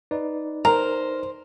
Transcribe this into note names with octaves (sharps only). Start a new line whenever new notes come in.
D#4 B4 D5
A#4 C5 A#5